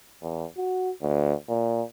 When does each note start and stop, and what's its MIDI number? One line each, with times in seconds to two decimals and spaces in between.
0.22 0.45 40
0.57 0.90 66
1.02 1.34 38
1.49 1.82 46